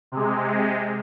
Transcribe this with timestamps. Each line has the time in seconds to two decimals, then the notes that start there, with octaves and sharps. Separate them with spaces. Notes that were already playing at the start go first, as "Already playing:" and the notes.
0.12 C3 G#3